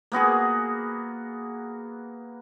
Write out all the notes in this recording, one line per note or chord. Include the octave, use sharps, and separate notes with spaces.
A#3 B3 F#4 G#4